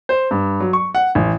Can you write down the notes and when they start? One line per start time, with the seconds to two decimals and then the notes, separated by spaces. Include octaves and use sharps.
0.09 C5
0.31 G2
0.60 F#3
0.73 C#6
0.95 F#5
1.15 A1